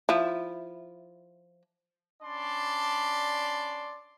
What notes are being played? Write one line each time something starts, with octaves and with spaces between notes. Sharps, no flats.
F3 E4
C#4 D4 D5 A5 B5 C6